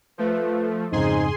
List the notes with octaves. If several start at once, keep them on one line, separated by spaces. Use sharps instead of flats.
F3 A3 B4
F2 G#2 C#3 D#4 G#4 C5 G#5 C6